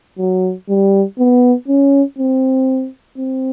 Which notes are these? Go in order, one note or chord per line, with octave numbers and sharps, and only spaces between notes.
F#3
G3
B3
C#4
C4
C4